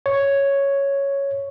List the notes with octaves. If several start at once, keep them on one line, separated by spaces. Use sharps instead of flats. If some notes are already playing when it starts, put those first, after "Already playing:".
C#5